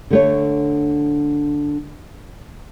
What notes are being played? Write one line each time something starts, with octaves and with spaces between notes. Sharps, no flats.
D3 A3 C#5